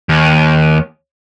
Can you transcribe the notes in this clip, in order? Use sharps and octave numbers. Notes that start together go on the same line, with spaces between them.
D#2